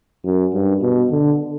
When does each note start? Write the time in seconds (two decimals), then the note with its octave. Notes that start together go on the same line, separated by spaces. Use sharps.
0.25 F#2
0.54 G2
0.82 B2
1.12 D3